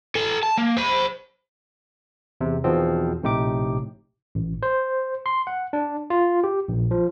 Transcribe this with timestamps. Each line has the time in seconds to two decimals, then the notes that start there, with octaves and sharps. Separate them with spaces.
0.15 A4 G#5
0.43 A5
0.58 A#3
0.77 C5 B5
2.41 E2 C3
2.64 E2 B2 D#3 F3 B3 C4
3.22 A#1 A2 C3 D#4 G4 D6
4.35 A1
4.63 C5
5.26 C6
5.47 F#5
5.73 D4
6.10 F4
6.44 G4
6.68 A#1
6.91 F3